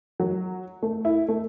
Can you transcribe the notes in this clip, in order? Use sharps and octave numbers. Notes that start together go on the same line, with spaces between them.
F#3
A3
E4
A3